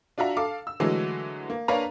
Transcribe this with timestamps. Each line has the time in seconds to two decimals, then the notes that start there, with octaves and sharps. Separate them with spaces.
0.18 D4 F4 F#4 E5 A#5
0.37 A4 F5 D6
0.67 E6
0.80 D3 E3 F#3 G#3 A3
1.50 A#3
1.68 A#3 D4 B4 C#5 F5 A#5